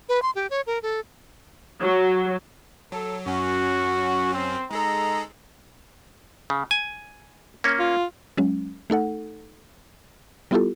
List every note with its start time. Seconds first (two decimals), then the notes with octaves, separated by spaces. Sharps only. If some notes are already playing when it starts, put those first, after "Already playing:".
0.09 B4
0.22 C6
0.35 G4
0.50 C#5
0.67 A#4
0.83 A4
1.81 F#3
2.92 F#3 A4
3.26 F#2 F#3 C#4 F#4
4.32 C4
4.71 G#3 D#4 G#4 A4 A#5
6.50 C#3
6.71 G#5
7.64 A#3 C#4
7.79 F4
8.37 F#3 G#3 C#4
8.90 A3 D#4 A4 F#5
10.51 G3 B3 E4 F4 G4 A4